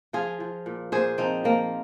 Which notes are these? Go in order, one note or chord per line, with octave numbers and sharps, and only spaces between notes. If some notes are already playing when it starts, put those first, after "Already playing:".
F3 F4 G#4
F3
A#2
A#2 G#4 C5
F3 C4 D#4
F3 A#3